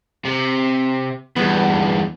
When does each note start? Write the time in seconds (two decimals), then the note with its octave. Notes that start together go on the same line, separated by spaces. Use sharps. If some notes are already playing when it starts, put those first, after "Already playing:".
0.25 C3
1.36 E2 G2 B3